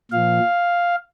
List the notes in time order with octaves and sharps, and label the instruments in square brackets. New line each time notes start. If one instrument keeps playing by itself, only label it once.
[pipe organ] A#2 F3 F5